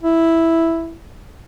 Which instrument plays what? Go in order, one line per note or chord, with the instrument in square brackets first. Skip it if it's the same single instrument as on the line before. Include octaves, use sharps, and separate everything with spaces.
[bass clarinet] E4